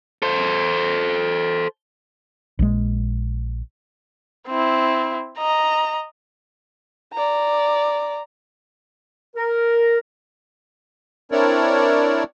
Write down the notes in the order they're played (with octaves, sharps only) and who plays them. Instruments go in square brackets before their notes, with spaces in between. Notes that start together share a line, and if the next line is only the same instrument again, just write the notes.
[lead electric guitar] A4 C5
[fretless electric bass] A#1 G#3
[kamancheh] C4 E4
D#5 A#5
D5 A#5
[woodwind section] A#4
[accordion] C4 D4 E4 A#4 C#5 D5